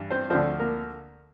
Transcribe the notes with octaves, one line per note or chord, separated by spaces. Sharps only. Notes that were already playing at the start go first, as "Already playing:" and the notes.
Already playing: G2 E3
C4 C5
D2 D3 F3 C4 C5
A#3 A#4